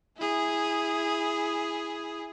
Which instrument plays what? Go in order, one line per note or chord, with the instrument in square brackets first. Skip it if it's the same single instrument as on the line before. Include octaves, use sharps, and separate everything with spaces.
[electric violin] E4 G#4